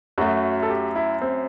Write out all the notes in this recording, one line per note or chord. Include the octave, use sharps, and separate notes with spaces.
F#2 F#3 A3 F#4
A4
G4
E4
C4